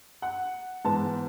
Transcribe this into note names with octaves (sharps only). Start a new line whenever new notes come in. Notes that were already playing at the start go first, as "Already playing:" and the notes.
F#5
G#2 E3 G#3 B3 A5